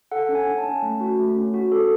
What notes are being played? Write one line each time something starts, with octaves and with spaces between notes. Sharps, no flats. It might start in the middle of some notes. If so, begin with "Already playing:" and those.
A4 F#5
C#4
G#5
C#4
A5
C#4
A3
F#4
A3
C#4
F#4
A4